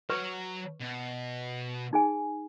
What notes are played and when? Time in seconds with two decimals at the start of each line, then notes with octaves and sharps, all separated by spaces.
0.10 F#3 B4 C#5 C#6
0.81 B2
1.93 D#4 G#4 G#5